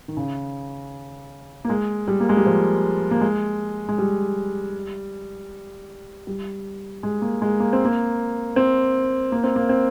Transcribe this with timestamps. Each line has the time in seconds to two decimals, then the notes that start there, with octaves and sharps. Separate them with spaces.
0.08 D#3
0.17 C#3
1.65 A#3
1.69 G#3
2.08 G3
2.20 A#3
2.29 G#3
2.37 G3
2.46 F3
3.11 A#3
3.21 G#3
3.89 G#3
3.98 G3
6.27 G3
7.03 G#3
7.22 A#3
7.42 G#3
7.60 A#3
7.73 C4
7.85 A#3
8.56 C4
9.32 A#3
9.44 C4
9.56 A#3
9.69 C4